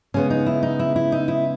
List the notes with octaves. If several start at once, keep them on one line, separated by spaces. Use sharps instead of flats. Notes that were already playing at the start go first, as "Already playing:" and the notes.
C#3 G#3 B3 C#4
D#4
E4
D#4
E4
E4
D#4
E4